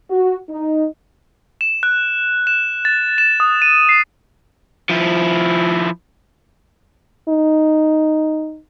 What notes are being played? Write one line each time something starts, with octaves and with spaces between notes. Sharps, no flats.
F#4
D#4
E7
F#6
E7
A6
E7
D#6
D#7
C7
F3 E4
D#4